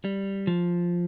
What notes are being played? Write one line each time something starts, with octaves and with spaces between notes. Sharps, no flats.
G3
F3